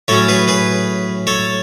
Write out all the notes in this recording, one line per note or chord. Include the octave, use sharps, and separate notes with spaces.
A2 F#3 C#4 A4 C#5
G#4 B4
G#4 B4
A4 C#5